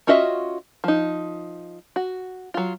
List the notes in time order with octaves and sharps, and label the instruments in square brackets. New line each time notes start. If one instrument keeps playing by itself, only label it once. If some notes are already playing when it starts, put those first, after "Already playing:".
[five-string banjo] C#4 F4 F#4 D#5 E5
F3 D#4
F#4
F#3 F4